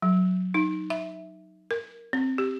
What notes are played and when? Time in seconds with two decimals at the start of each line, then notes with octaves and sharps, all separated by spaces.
0.02 F#3
0.54 D#4
0.90 E5
1.71 A#4
2.13 C4
2.38 G4